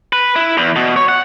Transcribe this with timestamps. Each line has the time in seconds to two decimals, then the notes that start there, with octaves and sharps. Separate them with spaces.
0.13 B4
0.36 E4
0.57 E2
0.76 B2
0.96 C#5
1.09 F#5